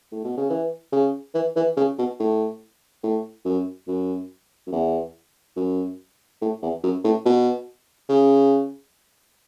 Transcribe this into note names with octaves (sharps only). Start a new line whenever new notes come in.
A2
B2
C#3
E3
C#3
E3
E3
C#3
B2
A2
A2
F#2
F#2
F#2
E2
F#2
A2
E2
F#2
A2
B2
C#3